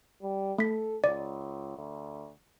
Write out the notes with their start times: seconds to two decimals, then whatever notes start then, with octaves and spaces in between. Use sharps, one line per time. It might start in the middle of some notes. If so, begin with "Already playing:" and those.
0.22 G3
0.58 A3 A4 B6
1.04 C#2 D5
1.76 D2